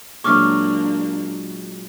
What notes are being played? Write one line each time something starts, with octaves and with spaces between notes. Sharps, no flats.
A#2 F#3 G#3 A#3 D4 C#6 D6 F6